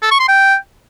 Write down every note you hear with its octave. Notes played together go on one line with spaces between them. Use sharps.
A4
C#6
C6
G5